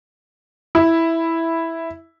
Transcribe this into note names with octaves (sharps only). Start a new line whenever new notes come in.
E4